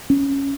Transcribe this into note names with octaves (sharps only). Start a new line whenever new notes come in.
C#4